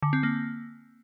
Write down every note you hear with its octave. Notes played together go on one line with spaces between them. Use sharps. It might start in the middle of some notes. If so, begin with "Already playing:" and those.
D3
C4
A#3